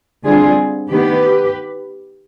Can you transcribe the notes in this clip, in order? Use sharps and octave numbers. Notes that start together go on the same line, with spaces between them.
D3 G3 C4 F4 G#4
D#3 B3 G4 B4